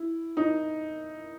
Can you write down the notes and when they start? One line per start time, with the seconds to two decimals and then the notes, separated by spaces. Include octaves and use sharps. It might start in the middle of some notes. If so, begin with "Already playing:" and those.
Already playing: E4
0.37 D#4